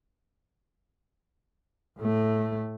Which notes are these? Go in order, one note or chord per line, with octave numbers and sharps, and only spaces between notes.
A2 A3